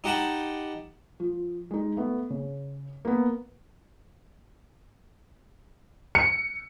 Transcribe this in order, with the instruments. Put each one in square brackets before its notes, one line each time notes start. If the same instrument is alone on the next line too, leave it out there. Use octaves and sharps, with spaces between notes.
[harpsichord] D#4 G4 F#5 A5 B5
[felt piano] F3
G#3 D#4
A3 B3
C#3
A#3 B3
[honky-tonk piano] C#7